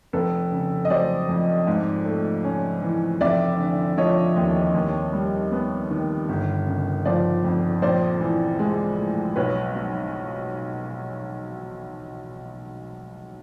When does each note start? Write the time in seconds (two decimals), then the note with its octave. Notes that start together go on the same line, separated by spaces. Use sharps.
0.13 F1 A4 B4
0.52 C#3
0.85 D#5
0.90 F#3 C5 D5
1.29 F2
1.67 G#2
2.05 A3
2.44 C#4
2.82 E3
3.21 F1 D5 E5
3.59 D3
3.97 F3 C#5 D#5
4.36 D#2
4.74 D#2
5.13 G3
5.52 B3
5.91 D#3
6.29 G1
6.67 C#3
7.05 F3 C5 D5
7.44 F2
7.82 A#1 C5 D5
8.21 E3
8.59 G#3
8.98 A2
9.36 B1 B4 C#5
9.75 F#3